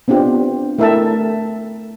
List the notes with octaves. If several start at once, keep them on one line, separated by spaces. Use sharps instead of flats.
B3 C4 D4 F4 G4
A3 E4 A#4 E5 G5 A5